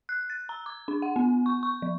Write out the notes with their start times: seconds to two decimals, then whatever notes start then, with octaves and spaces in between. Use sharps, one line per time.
0.09 F#6
0.30 A6
0.49 A#5
0.66 D6
0.88 D4
1.02 F#5
1.16 B3
1.46 C#6
1.63 C#6
1.82 F3